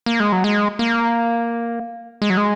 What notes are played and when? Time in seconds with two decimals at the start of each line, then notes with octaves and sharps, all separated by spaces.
0.06 A#3
0.20 G#3
0.32 F#3
0.44 G#3
0.79 A#3
2.22 G#3
2.30 F#3
2.37 G#3